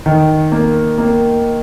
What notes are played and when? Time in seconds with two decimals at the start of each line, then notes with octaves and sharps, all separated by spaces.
0.06 D#3
0.52 A#3
0.98 A#3